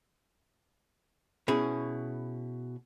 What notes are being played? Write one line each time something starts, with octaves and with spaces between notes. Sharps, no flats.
B2 C#4 E4 G#4